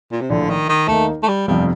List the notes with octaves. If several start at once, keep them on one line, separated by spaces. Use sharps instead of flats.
A#2
C3
A#1 A2 D3 F3 A3
D#3
D#3
D#2 D#3 A3 A#3 D#4
A3
G3
G1 F2 C3 F3 G3